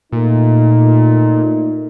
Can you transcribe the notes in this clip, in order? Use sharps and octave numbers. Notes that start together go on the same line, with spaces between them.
A#2 A3 A#3 D#4